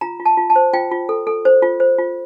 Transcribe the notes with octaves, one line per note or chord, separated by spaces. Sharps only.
F4 A#5
F4
A5
F4
A5
C5
F4 G5
F4
A4
A4
C5
F4
C5
F4